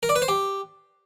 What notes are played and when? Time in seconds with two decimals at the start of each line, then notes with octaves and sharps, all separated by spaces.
0.03 A#4
0.09 D5
0.16 B4
0.22 C5
0.28 G4